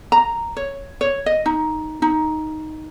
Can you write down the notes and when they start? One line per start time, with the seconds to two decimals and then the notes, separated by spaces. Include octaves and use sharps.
0.12 A#5
0.57 C#5
1.01 C#5
1.26 D#5
1.46 D#4
2.02 D#4